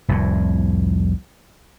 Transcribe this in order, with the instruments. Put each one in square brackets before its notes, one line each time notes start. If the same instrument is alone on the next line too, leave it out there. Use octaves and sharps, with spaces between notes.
[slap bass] F1 C2 F2 A2